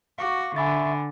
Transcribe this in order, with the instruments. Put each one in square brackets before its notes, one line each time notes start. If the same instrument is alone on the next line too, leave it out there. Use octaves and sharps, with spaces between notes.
[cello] F#4 [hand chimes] F5 C#6 D6
[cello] D3 [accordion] E5 C#6 [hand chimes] G#5 B5 A6